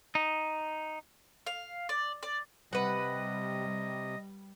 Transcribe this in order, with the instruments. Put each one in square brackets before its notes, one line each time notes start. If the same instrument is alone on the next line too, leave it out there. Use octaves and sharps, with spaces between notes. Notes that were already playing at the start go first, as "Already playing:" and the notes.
[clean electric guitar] D#4
[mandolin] F5
D5
D5
[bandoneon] C3 [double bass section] G3 [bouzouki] B4 F#5 [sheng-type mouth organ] D#5